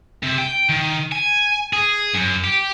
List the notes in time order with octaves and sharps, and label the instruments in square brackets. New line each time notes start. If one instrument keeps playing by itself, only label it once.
[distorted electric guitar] C3
G5
D#3
G#5
G#4
F#2
G4